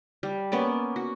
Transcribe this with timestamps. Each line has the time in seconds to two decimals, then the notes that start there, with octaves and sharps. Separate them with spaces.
0.23 G3
0.52 A#3 B3 C#4 D5
0.96 F#4